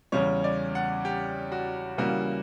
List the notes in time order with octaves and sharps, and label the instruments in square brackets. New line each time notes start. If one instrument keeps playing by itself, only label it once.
[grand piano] E2 C#3 G3 C#5
D5
F#5
G4
F#4
C#3 E3 G3 A#3 F#4